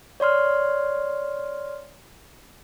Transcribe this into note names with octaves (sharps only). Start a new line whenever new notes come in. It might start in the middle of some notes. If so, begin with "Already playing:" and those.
C#5 D5 C6 F6